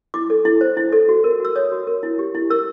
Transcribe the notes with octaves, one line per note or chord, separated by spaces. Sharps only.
E4 D6
A4
E4
C5
E4
A4
F#4
A#4
F#4 E6
C#5 D#6
F#4
A#4
E4
G4
E4
A#4 E6